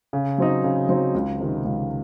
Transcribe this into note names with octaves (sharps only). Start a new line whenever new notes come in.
C#3
F#3 C4 D#4
C#3
F#3 C4 D#4
C#2
C3 D#3
C#2